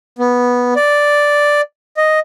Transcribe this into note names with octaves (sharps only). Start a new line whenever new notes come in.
B3
D5
D#5